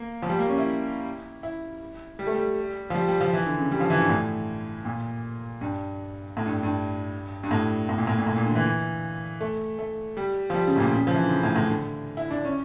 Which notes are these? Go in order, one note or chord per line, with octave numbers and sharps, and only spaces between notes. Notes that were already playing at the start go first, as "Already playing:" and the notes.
Already playing: A#3
F3
G3
A#3
C#4
E4
E4
G3
A3
G3
F3
G3
G3
F3
E3
D3
C#3
G3
F3
E3
G2
A2
A#2
G2
A2
G2
G2
G2
A2
A2
A#2
A2
A#2
A2
A#2
D3
E3
A3
A3
G3
F3
G3
C#3
A2
A#2
C#3
F3
E3
D3
C#3
A2
A2
D3
E4
D4
C#4